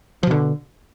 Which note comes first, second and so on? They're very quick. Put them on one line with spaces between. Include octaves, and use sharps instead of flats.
F3 B2 D3